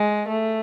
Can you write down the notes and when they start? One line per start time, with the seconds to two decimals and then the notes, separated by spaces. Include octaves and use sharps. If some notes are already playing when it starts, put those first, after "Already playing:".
Already playing: G#3
0.28 A3